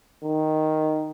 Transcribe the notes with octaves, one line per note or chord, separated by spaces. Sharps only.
D#3